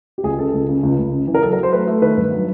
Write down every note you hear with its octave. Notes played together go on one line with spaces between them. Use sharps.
G4
C#2 G#4
C#3 A4
C#2
C#3
C#2
C#2
C#3
E3
A#4
F#3 A4
A#4
F#3
C5
A3 B4
A3
D#3 B4
G2
F#3